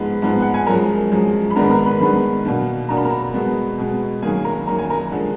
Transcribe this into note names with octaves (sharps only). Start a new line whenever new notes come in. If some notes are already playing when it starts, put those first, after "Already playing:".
Already playing: G#2 F3 G#3 B3
G#2 F3 G#3 B3
F#5
G#5
F#2 F3 G#3 A#4 A#5
F#2 F3 G#3
B5
G#2 D#3 G#3 B3 D4 A#4 A#5
A#4 A#5
B4 B5
G#2 D#3 G#3 B3 D4
B2 A#3 D4
B2 A#3 D4 A#5
B5
A#4 A#5
B2 G#3 B3
B2 G#3 B3
F#2 D#3 A#3 G#4 G#5
A#4 A#5
F#2 D#3 A#3 A#5
G#5
A#4 A#5
D3 F3 G#3